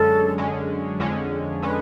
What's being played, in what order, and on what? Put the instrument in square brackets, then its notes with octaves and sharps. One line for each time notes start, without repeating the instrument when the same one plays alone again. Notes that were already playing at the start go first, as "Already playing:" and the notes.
Already playing: [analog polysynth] F#2 D3 G#3 C#4 [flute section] A4
[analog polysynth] F#2 D3 G#3 C#4
F2 D3 G#3 C#4
[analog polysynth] D3 G#3 C#4 [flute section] B4